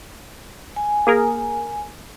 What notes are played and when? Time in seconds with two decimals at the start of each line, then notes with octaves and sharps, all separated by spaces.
0.76 G#5
1.07 A#3 G#4 A#4